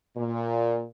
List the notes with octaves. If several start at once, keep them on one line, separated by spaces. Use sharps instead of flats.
A#2